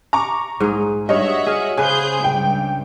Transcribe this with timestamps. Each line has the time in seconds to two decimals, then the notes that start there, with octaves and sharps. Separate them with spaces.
0.13 A#5 C#6 D6
0.60 A#1 G#2 G#4
1.09 G2 F#4 C#5 D#5 E5 F#5
1.46 G#4 F5
1.78 C#3 G#4 B4 C5 G#5 G6
2.24 C#2 G2 G5